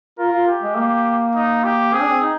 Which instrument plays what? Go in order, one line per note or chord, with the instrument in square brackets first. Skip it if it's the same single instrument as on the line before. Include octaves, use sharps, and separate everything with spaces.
[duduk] F4 [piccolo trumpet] A#4
[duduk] F4
[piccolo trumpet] G4
[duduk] G#3
A#3
[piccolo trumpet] D#4
G4
[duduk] C4 [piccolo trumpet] G#4
[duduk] D4
C4
D#4